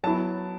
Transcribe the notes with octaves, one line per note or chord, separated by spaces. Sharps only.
F#3 B3 E4 A5